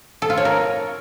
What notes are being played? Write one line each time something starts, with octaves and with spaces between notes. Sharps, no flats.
A4
F4
C#5
A#4